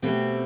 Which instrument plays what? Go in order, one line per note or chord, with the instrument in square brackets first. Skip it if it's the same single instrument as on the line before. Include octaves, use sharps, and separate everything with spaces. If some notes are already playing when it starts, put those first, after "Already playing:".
[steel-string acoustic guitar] B2 A3 C4 G4